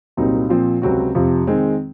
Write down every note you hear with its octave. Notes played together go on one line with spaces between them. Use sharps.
C2 A#2 F#3 C4 D#4
A#2 F3 C4
C#2 C3 F#3 C4 F#4
F2 C3 F3
D#3 G#3 C4